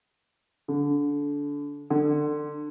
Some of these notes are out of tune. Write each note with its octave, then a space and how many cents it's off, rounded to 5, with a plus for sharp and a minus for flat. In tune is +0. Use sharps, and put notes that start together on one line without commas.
D3 -25
D3 +25